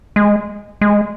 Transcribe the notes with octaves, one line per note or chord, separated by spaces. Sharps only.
G#3
G#3